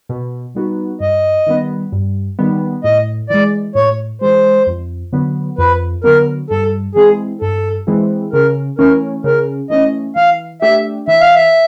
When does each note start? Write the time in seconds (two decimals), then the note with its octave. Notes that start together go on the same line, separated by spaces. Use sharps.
0.09 B2
0.55 G3 B3 D#4 F#4
1.00 G2 D#5
1.47 D#3 G3 B3
1.92 G2
2.39 D#3 G3 B3
2.84 A2 D#5
3.30 E3 G#3 D5
3.75 A2 C#5
4.21 E3 G#3 C5
4.67 F2
5.13 D3 F#3 B3
5.58 F2 B4
6.04 D3 F#3 B3 A#4
6.50 G2 A4
6.95 E3 G#3 C4 E4 G#4
7.41 G2 A4
7.87 E3 G#3 C4 E4
8.33 C#3 A#4
8.79 E3 A3 C#4 A#4
9.24 C#3 A#4
9.70 E3 A3 C#4 D#5
10.16 E3 F5
10.62 A3 D4 G4 E5
11.08 E3 E5
11.21 F5
11.35 E5